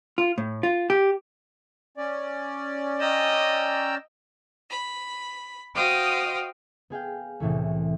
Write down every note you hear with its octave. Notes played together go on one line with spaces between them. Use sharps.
F4
A2
F4
G4
C#4 D5
D#5 G5 A#5 E6
B5
F#4 C5 D#5 F5 G5 D#6
B3 G#4 F5 G5
C2 A2 E3 A3